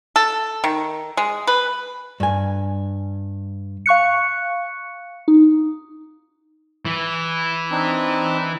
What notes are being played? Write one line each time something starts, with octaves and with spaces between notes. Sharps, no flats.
A4
D#3
G#3
B4
G2 G#5
F5 C#6 F#6 C#7
D#4
E3
C4 D4 D#4